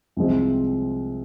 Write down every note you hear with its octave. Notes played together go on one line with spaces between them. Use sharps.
C2 C3 F3 G#3 C4